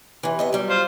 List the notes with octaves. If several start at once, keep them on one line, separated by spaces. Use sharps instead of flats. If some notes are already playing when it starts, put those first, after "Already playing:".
C3 E3
C3 B3 D#5
F#3 G3
F4 C5